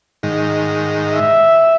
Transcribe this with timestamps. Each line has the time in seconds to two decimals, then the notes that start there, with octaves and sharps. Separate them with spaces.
0.23 G#2 D#3
1.14 E5